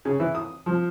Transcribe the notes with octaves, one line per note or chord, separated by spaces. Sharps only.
C#3
E3
D#6
F3